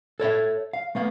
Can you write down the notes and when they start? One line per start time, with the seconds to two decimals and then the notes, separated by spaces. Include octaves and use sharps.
0.20 A4 C#5 D#5 E5
0.73 F5
0.95 A3 B3 F5